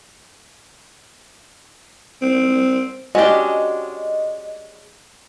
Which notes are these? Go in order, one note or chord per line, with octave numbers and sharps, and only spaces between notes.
C4
G#3 C#4 D4 F#4 G4 D#5